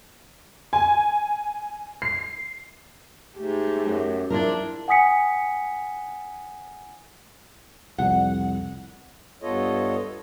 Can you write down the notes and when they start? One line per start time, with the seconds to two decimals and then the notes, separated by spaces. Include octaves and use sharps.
0.73 G#5
2.02 C7
3.37 G#2 A3 G4
3.86 F#2
4.30 A#1 D4 E4 F4 A#4
4.88 F#5 G#5 D#6 B6 C#7
7.98 C2 F2 F#5
9.42 G2 B3 F4 A4 C#5 D#5